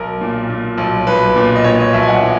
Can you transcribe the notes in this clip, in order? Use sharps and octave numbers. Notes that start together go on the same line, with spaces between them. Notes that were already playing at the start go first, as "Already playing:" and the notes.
Already playing: B1 A#4
A#2
A#2
B1
B1 B4
A#2
D#5
A#2 C#5
D#5
B1 E5
G#5
F#5
E3